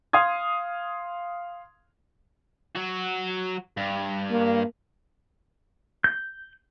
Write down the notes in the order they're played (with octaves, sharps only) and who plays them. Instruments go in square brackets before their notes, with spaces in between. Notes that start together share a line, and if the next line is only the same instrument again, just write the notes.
[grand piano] F5 C6 D#6 G#6
[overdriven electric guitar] F#3 F#4
G2
[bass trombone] A#3
[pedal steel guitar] G6